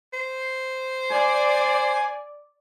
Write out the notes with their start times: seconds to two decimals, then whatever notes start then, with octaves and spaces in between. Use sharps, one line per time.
0.13 C5
1.12 D5 G#5